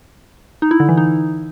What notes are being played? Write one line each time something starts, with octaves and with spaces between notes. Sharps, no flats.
D#4
E4
D3
E3
D#4